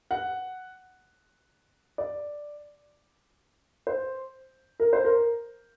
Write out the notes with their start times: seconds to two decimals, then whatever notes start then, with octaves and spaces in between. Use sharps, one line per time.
0.11 F#5
1.98 D5
3.87 C5
4.80 A#4
4.93 C5
5.05 A#4